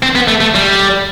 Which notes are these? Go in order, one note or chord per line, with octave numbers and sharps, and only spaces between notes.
C4
B3
A3
A3
G3